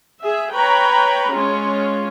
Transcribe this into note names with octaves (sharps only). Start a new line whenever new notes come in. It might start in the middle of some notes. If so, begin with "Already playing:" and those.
G#4 E5
B4 C#5 G5 A#5 B5
G#3 C#4 F4